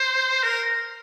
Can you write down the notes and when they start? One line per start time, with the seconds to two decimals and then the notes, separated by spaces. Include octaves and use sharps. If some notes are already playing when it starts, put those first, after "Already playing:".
Already playing: C5
0.43 A#4